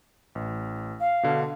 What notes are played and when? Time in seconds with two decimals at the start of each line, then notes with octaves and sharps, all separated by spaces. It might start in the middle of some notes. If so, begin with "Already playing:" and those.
0.35 A1
1.00 F5
1.23 B2 D3